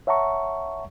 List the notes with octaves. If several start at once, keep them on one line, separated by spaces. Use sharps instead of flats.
C#5 E5 F#5 A5 A#5 C#6